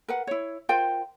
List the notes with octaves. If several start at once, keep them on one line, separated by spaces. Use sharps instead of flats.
A#4 B4 F#5
E4 C#5
F4 A#4 C5 G5